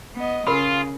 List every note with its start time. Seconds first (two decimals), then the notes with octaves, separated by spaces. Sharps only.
0.16 B3 D#5
0.47 C#3 F4 G#4 A#4 B5